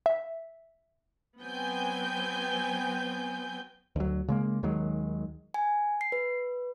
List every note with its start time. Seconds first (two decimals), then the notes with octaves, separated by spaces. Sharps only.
0.06 E5
1.40 F#3 B3 C4 G5 G#5 G6
3.96 D2 F#3
4.28 C#3 G#3 A#3
4.63 D#2 D#3 F#3 G#3
5.54 G#5
6.01 C7
6.12 B4